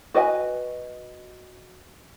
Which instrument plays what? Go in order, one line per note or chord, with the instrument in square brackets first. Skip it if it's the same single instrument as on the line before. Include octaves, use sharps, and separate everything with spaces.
[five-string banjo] F#4 B4 D#5 G5 G#5